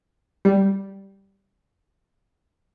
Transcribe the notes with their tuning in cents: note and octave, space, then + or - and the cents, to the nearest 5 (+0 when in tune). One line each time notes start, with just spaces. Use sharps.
G3 -5